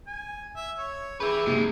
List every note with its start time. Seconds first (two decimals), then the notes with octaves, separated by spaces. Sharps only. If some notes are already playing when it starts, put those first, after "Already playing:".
0.07 G#5
0.56 E5
0.78 C#5
1.20 G4 G#4 B4 E5
1.46 F#1 C3 D#3 G#3